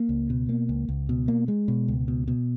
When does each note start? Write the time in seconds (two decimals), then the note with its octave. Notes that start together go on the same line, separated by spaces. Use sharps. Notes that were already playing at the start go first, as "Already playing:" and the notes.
Already playing: A#3
0.09 C#2
0.30 B2
0.49 A#3
0.69 C#2
0.89 C#2
1.09 B2
1.28 A#3
1.48 G#3
1.68 B2
1.88 C#2
2.08 B2
2.28 B2